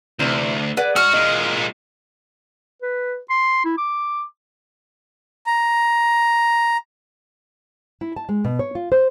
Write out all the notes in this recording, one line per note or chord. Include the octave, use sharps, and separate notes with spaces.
D2 C3 E3 D4
G#4 B4 D5 F#5
G#3 F#4 F6
A#2 G#3 D#5
B4
C6
E4
D6
A#5
E4
A5
G#3
B2
C#5
F4
C5